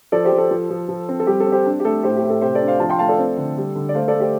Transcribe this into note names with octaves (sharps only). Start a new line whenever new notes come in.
F3 A4 D5
G4 C5
F3
A4
F3
F3
F3
C4
A4
G3 G4
A4
C4
G4 C5
D4
G4
A3 A4
A2 G4 C5
G4
A2
A4
C3 G4 C5
A4 D5
D4
C5 F5
F3 F5 A5
G5 C6
A3 F5 A5
A4 D5
C4
D3
G3
D3
D5
A3 C5 F5
A4 D5
A3
G4 C5